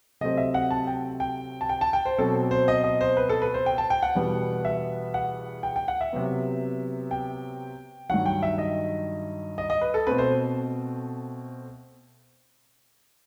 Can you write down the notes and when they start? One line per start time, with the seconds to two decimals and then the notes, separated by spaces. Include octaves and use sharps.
0.21 C3 F#3 A3 C4 D#5
0.37 E5
0.54 F#5
0.71 A5
0.87 G5
1.20 G5
1.61 A5
1.69 G5
1.81 A5
1.93 G5
2.05 C5
2.18 B2 F#3 C4 A4
2.51 C5
2.68 D#5
2.84 D#5
3.01 C5
3.17 B4
3.29 A4
3.42 B4
3.54 C5
3.66 G5
3.78 A5
3.90 G5
4.03 F#5
4.15 E2 B2 G3 B3
4.65 E5
5.14 F#5
5.63 G5
5.76 G5
5.88 F#5
6.01 E5
6.13 C3 F#3 B3
7.11 G5
8.10 G2 D#3 F#3 F#5
8.26 G5
8.43 E5
8.58 D#5
9.58 D#5
9.70 D#5
9.81 B4
9.94 A4
10.07 B2 A3 C4 B4
10.18 C5